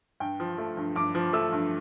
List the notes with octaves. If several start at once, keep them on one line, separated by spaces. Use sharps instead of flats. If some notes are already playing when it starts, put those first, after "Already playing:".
G2 G5
F3
A3
G2
G2 D6
F3
A3 E6
G2